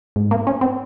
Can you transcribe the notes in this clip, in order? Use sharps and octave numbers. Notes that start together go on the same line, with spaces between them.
G#2
A#3
C#4
C4